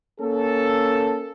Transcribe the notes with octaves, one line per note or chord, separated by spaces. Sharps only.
A#3 C#4 A4